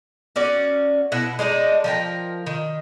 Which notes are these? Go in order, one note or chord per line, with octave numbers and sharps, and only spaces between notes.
C#4 F#4 D5
B2 E4 F#5
G#3 C4 D4 D#4
F3 A#4 G5
D#3